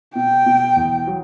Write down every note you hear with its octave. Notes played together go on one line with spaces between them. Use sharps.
B2 G5
B2
E2
F#3